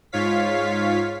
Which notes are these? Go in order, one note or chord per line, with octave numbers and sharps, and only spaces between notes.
G#2 F4 C#5 F5 B6